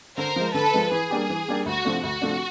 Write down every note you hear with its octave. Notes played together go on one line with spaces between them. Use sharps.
D3 A#4 C5
F3 G#3
D3 A4 B4
F3 G#3
E3 G#4
G3 A#3 D4 G4
E3
G3 A#3 D4 G4
D2 F#4
C3 F3 A3 D4
D2 F#4
C3 F3 A3 D4